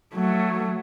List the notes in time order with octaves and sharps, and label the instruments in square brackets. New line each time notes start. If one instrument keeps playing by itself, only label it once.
[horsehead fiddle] F#3 A3